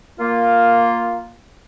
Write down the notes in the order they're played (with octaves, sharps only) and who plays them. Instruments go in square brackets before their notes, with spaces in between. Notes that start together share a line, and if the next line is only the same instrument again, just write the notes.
[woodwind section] A#3 F4